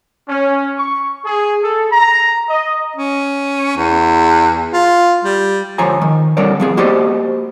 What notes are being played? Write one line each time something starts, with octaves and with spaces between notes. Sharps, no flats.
C#4
C#6
G#4
A4
A#5
D#5
C#4
E2
F4
G3
D2 F3 C#5 G#5 A#5
D#3
D3 E3 G3 A#4 C#5 D5
F3 B3 G#4
A#3 F#4 G4 C5 D5 D#5